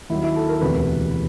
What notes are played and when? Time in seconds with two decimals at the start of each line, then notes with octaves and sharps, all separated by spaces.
0.10 D#2 D#3 F#3 E4
0.23 E4
0.36 A4
0.49 A#4
0.61 E1 D2 C3 E3 B4